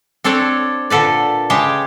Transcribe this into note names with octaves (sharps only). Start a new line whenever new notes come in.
C4 D4 A4 C#5 D5
A#2 D3 A4 B4 D5
C#3 G#3 G4 G5 A5